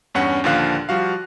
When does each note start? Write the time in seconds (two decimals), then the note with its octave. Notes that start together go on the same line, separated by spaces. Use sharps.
0.14 E2 G2 C#4 F#5
0.44 D#2 A#2 D3 F3 F5 F#6
0.89 F3 G3 F#4 F5